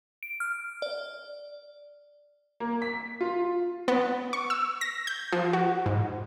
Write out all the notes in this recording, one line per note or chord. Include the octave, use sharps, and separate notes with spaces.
D7
F6
D5
A#3
B6
F4
B3
C#6
E6
A#6
G6
F3
F#4
G#2